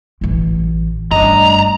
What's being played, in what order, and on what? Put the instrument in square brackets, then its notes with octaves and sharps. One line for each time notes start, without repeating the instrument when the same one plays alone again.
[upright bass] A1 E3
[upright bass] G2 A3 [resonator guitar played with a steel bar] D4 D#5 [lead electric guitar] A#5